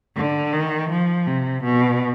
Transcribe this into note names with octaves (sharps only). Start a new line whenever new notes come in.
D3
D#3
F3
C3
B2